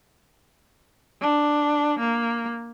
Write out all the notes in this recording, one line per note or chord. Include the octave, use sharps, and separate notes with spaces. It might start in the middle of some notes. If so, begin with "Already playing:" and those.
D4
A#3